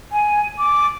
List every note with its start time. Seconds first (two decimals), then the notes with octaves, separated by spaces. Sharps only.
0.12 G#5
0.59 D6